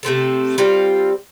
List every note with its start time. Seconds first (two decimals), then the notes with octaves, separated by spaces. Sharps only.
0.03 C3 A3 C4 A4
0.58 G3 C4 F4 A4